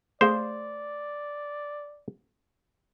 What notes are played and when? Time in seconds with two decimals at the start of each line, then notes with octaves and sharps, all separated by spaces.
0.21 A3 G#4 C5 D5 F5